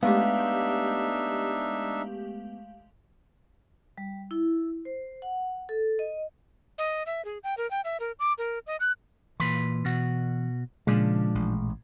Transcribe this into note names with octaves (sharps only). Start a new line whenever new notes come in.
G#3 A3 B3 D4 D#4 G4 E5 F5
G3
E4
C5
F#5
A4
D#5
D#5
E5
G#4
G5
A#4
G5
E5
A#4
D6
A#4
D#5
F#6
A#2 E3 B4 C6
B2 F#4
A#2 C#3 F3 G#3 D4
A1